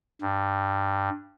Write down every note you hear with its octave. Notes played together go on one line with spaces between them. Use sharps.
G2